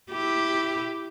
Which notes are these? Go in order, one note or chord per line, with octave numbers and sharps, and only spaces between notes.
E4 G4